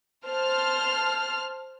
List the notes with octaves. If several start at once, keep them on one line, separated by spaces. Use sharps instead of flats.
C5 A5 F6